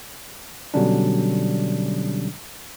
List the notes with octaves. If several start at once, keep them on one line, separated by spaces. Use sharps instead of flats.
B2 D3 F#3 G3 C#4 D4